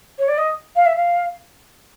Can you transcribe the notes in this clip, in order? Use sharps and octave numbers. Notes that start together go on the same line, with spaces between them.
C#5
D5
D#5
F5
E5
F5